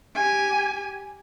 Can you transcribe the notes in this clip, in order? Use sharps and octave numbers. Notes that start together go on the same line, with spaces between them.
G4 G#5